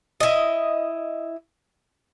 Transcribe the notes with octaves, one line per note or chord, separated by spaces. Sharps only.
E4 D#5